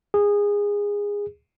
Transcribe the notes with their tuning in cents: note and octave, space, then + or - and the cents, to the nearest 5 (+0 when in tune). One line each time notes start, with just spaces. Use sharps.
G#4 -20